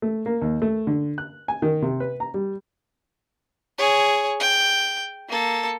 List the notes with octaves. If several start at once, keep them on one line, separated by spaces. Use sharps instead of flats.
A3
A#3
D#2
A3
D3
F#6
G#5
D#3
C3
B4
A#5
G3
G#4 C#5
G5
A#3 A4